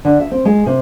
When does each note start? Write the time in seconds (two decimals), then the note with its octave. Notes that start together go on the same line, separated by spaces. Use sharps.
0.05 D3
0.20 E5
0.31 C4
0.45 G#3
0.66 C3